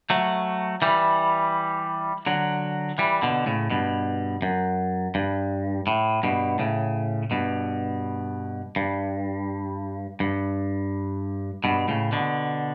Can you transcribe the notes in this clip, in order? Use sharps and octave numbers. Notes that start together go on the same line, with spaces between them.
F#3 A3
E3 G3
D3 F#3
E3 G3
B2 D3
A2 C#3
G2 B2
F#2
G2
A2
G2 B2
A2 C#3
G2 B2
G2
G2
G2 B2
A2 C#3
B2 D3